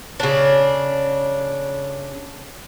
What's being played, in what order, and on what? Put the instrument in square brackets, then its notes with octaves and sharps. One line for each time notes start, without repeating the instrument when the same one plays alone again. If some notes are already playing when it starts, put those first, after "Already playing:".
[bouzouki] C#3 D4